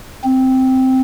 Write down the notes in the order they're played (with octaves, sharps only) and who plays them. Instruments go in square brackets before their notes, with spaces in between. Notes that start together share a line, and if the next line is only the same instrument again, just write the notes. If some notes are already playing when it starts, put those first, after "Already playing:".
[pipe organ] C4